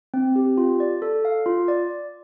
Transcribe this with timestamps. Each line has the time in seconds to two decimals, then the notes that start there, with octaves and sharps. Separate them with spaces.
0.14 C4
0.36 G4
0.58 F4
0.80 D5
1.02 A4
1.25 F5
1.46 F4
1.68 D5